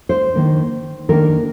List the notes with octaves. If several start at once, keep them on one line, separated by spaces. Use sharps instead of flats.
C5
D#3 A#3 D4
D#3 A#3 D4 A#4